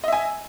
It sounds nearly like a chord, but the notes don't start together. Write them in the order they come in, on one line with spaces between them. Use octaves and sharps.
D#5 E5 G#5